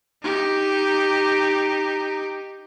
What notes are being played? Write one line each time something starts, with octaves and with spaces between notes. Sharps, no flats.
D#4 G4